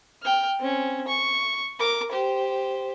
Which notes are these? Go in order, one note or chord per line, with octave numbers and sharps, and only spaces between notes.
G5 F6
C4 C#4
C#6
A#4 D6
G4 C5